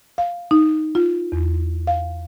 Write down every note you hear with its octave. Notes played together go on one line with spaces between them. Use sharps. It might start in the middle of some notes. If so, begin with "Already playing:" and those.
F5
D#4
F4
E2
F5